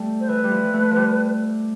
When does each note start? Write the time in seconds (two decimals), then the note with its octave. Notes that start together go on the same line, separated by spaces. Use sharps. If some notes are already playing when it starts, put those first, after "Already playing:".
Already playing: G3 A3
0.20 C5
0.28 E3 B4
0.44 G3
0.51 F3
0.74 A3
0.91 F3 G3